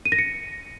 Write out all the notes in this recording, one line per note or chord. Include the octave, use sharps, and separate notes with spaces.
D#7
A#6
C#7